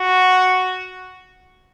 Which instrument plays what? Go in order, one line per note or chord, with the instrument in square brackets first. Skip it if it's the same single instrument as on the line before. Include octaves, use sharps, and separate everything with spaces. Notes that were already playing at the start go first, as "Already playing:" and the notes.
Already playing: [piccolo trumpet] F#4